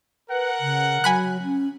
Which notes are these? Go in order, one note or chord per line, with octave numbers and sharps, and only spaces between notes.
A#4 B4 F#5
C#3
F#3 G#5 B5 F#6
C#4